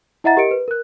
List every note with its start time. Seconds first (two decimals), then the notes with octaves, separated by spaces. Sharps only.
0.24 E4 D#5 E5 F#5 A#5 A6
0.37 G4 A#4 D#5 C#7 D7
0.51 B4
0.68 A#4 F#6